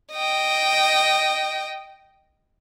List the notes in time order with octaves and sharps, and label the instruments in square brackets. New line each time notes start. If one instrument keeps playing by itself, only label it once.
[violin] D#5 G5